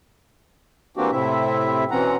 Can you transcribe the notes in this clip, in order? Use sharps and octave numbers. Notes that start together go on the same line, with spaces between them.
E3 A#3 C4 D4 F#4 G4
A2 C3 C4 E4 E5
B2 E3 C4 C#4 F#5 A#5